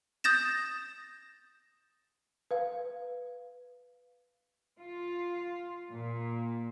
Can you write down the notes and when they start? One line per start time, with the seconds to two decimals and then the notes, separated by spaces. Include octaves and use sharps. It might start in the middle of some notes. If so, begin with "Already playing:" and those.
0.24 D#6 G6 A6 A#6 E7
2.51 B4 F5
4.79 F4
5.92 A#2